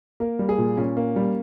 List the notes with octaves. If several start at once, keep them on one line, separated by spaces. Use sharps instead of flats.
A#3 A#4
G3
G#4
A#2
A#2 C#4
A#3
G3